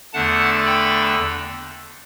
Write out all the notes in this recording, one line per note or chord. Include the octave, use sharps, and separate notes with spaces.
E2 D3 A3 D4 F#5 A5
G5 B5